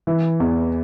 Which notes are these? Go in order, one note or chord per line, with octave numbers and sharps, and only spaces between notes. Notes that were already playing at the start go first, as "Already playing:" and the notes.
E3
E2